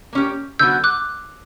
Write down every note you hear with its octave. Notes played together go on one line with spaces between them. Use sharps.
A#3 C#4 G4
D3 F#3 B3 F#4 E6 G6
D6 F#6